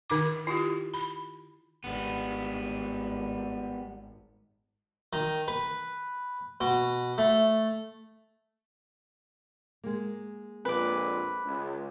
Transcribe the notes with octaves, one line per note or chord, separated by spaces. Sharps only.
D#3 D#4 D6
E4 F4 G4
B5
G#1 G3 B3
D#3
B4
B2
A3
G#3 A#3
A#1 F2 A#2 B4 D6
C#2